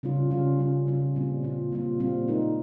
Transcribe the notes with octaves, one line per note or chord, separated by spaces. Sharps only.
C#3 G3 C#4 F4
C#3 G3 C#4 F4
C#3 G3 C#4 F4
C#3 G3 C#4 F4
A#2 G3 C4 F4
A#2 G3 C4 F4
A#2 G3 C4 F4
A#2 G3 C4 F4
G#3 D#4 A#4